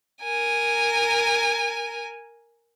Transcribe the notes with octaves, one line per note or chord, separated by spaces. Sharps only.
A#4 G#5